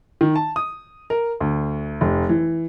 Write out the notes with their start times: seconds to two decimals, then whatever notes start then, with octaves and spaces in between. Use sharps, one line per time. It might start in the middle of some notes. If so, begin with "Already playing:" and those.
0.21 D#3
0.36 A5
0.56 D#6
1.10 A#4
1.40 D2
2.01 F1
2.29 E3